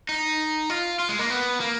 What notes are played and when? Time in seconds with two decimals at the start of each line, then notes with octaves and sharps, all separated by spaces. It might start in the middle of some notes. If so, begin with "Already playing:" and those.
0.09 D#4
0.70 F4
1.00 F4
1.09 G#3
1.19 A#3
1.30 B3
1.60 A#3